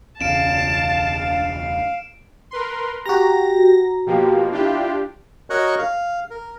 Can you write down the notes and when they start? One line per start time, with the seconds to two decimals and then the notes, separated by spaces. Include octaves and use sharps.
0.21 E1 C#2 C#4 F5 A5 D7 E7
2.51 A#4 B4 C6
3.06 F#4 G4 A#5 A#6
4.06 B2 F3 A#3 G4
4.52 D4 E4 F4 G4
5.50 F#4 A#4 C#5 D#5 C#6 F#6
5.79 F5
6.30 A#4